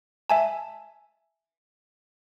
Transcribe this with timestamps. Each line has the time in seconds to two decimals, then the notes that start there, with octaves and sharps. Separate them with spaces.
0.30 E5 G#5 A5